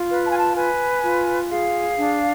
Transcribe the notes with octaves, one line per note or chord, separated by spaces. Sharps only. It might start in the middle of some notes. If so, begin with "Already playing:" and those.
Already playing: F4
B4
A5
G#5
A5
B4 G#5
F4
G#4 F5
D4